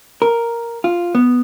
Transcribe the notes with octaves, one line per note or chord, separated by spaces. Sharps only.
A#4
F4
B3